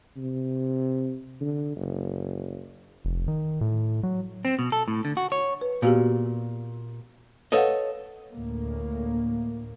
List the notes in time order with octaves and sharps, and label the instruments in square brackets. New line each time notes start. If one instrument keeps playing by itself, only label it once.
[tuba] C3
D3
F#1
[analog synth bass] F1
D#3
A2
F#3
[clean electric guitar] C4
B2
A4
A2
D3
F#4
C#5
[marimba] B4
[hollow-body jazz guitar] A#2 [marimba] B3 F#4 G4
[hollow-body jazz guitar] A4 C#5 D#5 [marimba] B4 F5 F#5
[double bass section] D2 A2 A#3